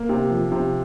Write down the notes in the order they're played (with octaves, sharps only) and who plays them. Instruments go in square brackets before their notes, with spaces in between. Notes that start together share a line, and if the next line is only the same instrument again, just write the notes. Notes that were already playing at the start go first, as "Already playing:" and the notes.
Already playing: [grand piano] A#3
C3
F3
C3